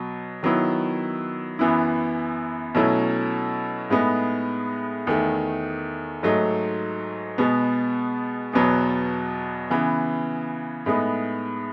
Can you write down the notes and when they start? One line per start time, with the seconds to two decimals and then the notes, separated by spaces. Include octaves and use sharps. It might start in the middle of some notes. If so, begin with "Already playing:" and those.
Already playing: B2 F#3
0.43 D#3 F#3 B3 E4
1.59 F#2 E3 B3 E4
2.75 B2 F#3 A3 C#4 E4
3.90 A2 G#3 B3 D#4
5.07 E2 D#3 A3
6.23 G#2 F#3 A3 D#4
7.38 B2 G#3 B3
8.53 E2 B2 F#3 B3
9.70 C#3 E3 B3
10.86 A2 G#3 B3 D#4